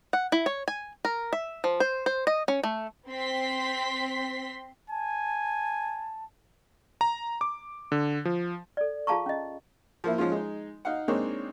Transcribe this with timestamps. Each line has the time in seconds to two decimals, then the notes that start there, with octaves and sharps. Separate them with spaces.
0.13 F#5
0.32 E4
0.46 C#5
0.68 G#5
1.05 A#4
1.33 E5
1.64 F3
1.80 C5
2.06 C5
2.27 D#5
2.48 C#4
2.63 A3
3.09 C4 C6 B6
4.90 G#5 A5
7.01 A#5
7.41 D6
7.92 D3
8.25 F3
8.77 A4 D5
9.07 F4 G#4 F5 A5 A#5 C#6
9.26 C#4 D#5
10.04 F3 A#3 E4
10.18 F3 G#3 C#4 F4
10.32 G#3 D#4
10.85 D#4 F5 F#5
11.08 G#3 A#3 C4 D4 D#4 C#5